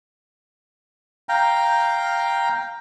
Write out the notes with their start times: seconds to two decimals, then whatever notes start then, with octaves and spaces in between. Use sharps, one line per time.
1.29 F5 G5 A#5